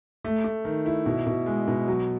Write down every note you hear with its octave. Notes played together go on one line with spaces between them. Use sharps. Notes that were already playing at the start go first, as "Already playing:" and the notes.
A3
A3
D#3
E4
B2
B2
G#3
B2
F#3